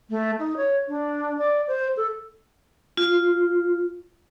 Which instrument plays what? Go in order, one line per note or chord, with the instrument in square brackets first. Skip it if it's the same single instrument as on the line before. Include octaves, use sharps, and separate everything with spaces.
[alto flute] A3
D#4
C#5
D4
D5
C5
A4
[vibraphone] F4